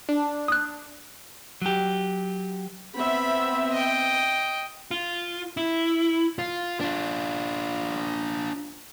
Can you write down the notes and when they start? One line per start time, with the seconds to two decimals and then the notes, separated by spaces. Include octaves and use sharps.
0.09 D4
0.48 D#6 F#6
1.62 F#3 G4
2.96 B3 C4 E5 B5
3.73 D#5 G5
4.91 F4
5.57 E4
6.39 F4
6.80 D4 F4